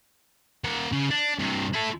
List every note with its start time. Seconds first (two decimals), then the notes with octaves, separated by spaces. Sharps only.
0.64 A#3 F#5
0.92 C#3
1.11 D4
1.39 G2 C3
1.74 E4 A4